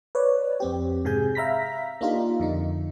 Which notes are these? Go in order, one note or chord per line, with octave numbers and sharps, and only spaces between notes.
B4 C#5 D5
F2 C4 G4
G#2 C3 G#4 G#5 G6
E5 F5 A#5 B5 A#6 B6
A#3 D4 D#4 F4 G4 A#4
F2 D3 D#4